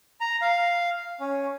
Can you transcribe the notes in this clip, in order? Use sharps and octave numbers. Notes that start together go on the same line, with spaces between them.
A#5
F5
C#4